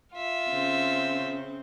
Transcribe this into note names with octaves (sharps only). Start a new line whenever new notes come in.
F4 E5
C#3 C4